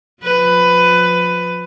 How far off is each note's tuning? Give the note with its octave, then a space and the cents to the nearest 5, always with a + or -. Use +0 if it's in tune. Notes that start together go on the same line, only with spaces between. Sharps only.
F3 +25 B4 +15